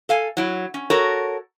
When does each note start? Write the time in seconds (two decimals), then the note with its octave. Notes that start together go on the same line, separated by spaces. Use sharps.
0.09 A4 F5 G#5
0.37 F#3 E4
0.74 C#4
0.90 F#4 A4 A#4 C#5